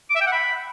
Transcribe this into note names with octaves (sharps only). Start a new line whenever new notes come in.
D6
E5
G5
F#5
B5